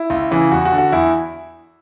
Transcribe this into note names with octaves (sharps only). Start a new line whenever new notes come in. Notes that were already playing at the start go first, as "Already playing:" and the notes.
Already playing: E4
C#2
C#3 E3
E2 F#4
F#4
D3
F#4
E2 E4